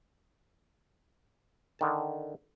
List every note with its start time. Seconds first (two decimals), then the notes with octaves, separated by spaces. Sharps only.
1.79 D3 D#3 A5